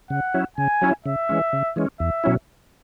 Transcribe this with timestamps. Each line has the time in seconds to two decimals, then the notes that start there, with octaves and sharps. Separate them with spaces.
0.10 C#3 F#5
0.34 F#3 C#4 E4
0.58 C#3 G#5
0.82 F#3 C#4 E4
1.06 C#3 E5
1.29 E3 G#3 C#4
1.53 C#3
1.76 E3 G#3 C#4
2.00 E2 E5
2.24 B2 F#3 C#4 E4